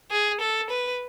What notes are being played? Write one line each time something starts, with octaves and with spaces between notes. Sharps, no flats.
G#4
A4
B4